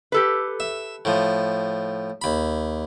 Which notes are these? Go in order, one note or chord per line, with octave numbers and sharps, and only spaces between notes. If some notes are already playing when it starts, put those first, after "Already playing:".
G4 A4 B4
E5
A2 F3
D#2 B5